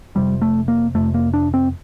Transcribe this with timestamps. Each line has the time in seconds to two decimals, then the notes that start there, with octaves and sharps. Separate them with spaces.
0.15 F1 F2 C3 G3
0.42 A3
0.68 A#3
0.94 F1 F2 C3 A3
1.14 A#3
1.33 D4
1.54 C4